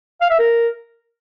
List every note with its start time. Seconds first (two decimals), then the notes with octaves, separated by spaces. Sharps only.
0.21 F5
0.30 E5
0.39 A#4